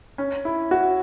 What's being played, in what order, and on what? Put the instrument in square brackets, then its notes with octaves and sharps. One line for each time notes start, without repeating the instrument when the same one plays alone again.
[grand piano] C#4
E4
F#4